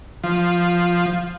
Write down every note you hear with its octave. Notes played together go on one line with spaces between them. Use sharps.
F3